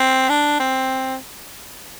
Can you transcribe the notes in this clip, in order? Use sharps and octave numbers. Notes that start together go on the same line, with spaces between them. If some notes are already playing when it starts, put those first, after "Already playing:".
Already playing: C4
D4
C4